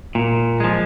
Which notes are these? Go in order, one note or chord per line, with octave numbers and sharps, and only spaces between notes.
A#2
F3 G#3